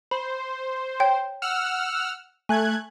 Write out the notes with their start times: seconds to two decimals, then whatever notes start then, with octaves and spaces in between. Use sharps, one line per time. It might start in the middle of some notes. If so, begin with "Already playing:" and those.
0.11 C5 B5
1.00 C#5 G5 G6
1.42 F#5 E6 F6
2.49 A3 G#5 F#6 G#6